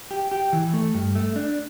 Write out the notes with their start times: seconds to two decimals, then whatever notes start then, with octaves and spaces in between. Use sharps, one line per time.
0.11 G4
0.32 G4
0.53 E3
0.73 A3
0.94 G2
1.15 A3
1.36 D4